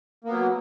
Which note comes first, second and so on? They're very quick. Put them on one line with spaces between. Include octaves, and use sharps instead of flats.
A#3 B3 F#3